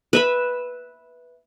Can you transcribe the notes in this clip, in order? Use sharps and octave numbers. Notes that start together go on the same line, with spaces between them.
B4 E5 B5